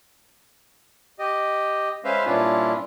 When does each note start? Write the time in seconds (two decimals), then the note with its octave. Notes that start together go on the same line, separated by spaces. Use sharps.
1.19 G4 D#5
2.05 G#3 C#4 B4 C5 E5 F5
2.26 G2 A#2 C#4 D4 E4 F4